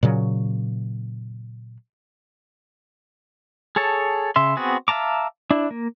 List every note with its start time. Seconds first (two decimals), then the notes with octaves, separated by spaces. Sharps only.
0.03 A#2 C#3 F#3
3.76 G#4 A4 C#5 A5
4.36 C#3 E5 C6
4.57 B3 C4 F#4 G#4
4.88 E5 F5 A5 A#5 D6
5.51 D4 E4
5.71 A#3